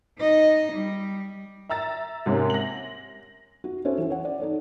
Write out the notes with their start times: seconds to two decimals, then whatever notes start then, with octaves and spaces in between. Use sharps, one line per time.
0.18 D#4 D#5
0.72 G3
1.69 E5 A#5 E6 A6
2.26 G#2 C3 A#3 C#4
2.50 A#6 F#7
3.64 F#4
3.85 C#4 F#4 A4 C5 C#5 E5
3.98 E3
4.10 C#5 F#5
4.25 D5
4.40 D#4 A4 C#5